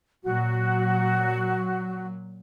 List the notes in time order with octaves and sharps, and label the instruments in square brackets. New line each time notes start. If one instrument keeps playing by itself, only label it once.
[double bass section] A#2 F#3 [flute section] F#4